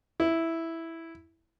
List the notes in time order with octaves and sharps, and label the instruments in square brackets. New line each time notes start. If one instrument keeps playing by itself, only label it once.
[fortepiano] E4